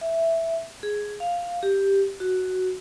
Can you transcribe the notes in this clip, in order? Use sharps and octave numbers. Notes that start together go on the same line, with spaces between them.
E5
G#4
F5
G4
F#4